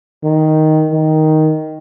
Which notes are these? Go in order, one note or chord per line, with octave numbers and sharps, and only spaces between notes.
D#3
D#3